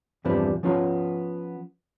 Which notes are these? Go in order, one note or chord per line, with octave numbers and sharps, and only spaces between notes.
E2 G2 C3 F3 D4 B4
F3 B3 C#4 F4 G#5 A#5